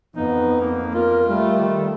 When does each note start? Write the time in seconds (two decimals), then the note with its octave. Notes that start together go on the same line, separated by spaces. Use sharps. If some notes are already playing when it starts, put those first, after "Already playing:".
0.16 F2 B3 D#4
0.61 A#3
0.94 F4 A#4
1.28 G3 A3
1.58 D#3